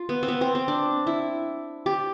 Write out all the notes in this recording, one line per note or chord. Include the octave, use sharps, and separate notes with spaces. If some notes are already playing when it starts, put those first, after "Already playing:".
Already playing: F4
B3
C4
B3
C4
C4
D4
E4
G4